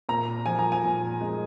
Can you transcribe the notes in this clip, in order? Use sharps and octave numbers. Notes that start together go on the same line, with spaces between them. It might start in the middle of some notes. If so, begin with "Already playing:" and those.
A#2 A#5
F3 G#5
A#5
G#5
A#2
G#3